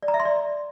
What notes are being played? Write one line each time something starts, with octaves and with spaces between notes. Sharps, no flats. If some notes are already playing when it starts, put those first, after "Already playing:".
D5
A#5
E5
C6
D5